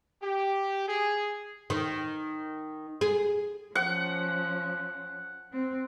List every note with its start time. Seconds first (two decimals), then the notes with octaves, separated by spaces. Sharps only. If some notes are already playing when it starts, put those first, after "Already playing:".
0.23 G4
0.87 G#4
1.70 D#3
3.01 G#4
3.75 F3 C#4 F#5
5.53 C4